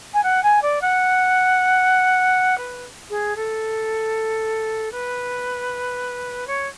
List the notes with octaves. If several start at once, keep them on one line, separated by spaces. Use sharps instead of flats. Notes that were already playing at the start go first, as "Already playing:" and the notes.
G#5
F#5
G#5
D5
F#5
B4
G#4
A4
B4
C#5